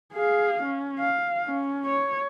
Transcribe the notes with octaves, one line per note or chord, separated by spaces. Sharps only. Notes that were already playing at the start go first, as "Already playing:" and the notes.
G#4 F5
C#4
F5
C#4
C#5